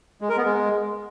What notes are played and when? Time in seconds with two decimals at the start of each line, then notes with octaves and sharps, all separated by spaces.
0.21 G#3
0.29 A#4
0.37 B3
0.45 G#3